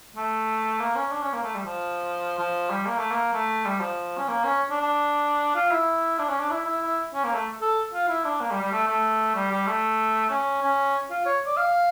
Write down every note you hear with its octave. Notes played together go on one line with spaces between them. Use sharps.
A3
A#3
C#4
D4
C#4
A#3
A3
G3
F3
F3
G3
A#3
A3
A#3
A3
G3
F3
C#4
A#3
C#4
D4
D4
F4
E4
D4
C#4
D4
E4
E4
E4
C#4
A#3
A3
A4
F4
E4
D4
A#3
G3
G3
A3
A3
G3
G3
A3
C#4
C#4
F4
C#5
D5
F5